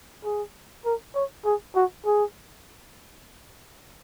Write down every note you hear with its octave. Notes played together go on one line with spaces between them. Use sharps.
G#4
A#4
C#5
G#4
F#4
G#4